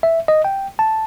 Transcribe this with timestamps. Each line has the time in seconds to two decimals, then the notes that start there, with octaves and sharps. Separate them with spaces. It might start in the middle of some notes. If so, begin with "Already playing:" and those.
0.03 E5
0.28 D#5
0.44 G5
0.79 A5